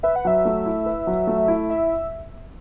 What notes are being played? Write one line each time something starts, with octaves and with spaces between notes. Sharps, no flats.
B4 E5
F#5
F#3 E5
A3
E4
B4
F#3
A3
E4
E5